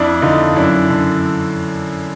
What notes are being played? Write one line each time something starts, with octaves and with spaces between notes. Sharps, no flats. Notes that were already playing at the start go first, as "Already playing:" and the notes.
Already playing: F2 D4 E4
D3 D#4 F4
F#2 D4 E4
D3